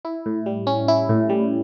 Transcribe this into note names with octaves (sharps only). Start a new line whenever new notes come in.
E4
A2
G3
C#4
E4
A2
G3